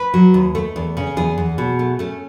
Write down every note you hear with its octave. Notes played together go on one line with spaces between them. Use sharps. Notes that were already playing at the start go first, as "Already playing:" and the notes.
Already playing: B4
F#3
D#2
A3
E2
C#3
E2 G#4
E2
B2
A3
A3 C#4